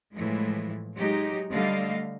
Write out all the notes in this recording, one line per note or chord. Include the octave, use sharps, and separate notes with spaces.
A2 E3 F3 G#3
F#3 G#3 D#4 G4
D3 G3 A3 D#5 F5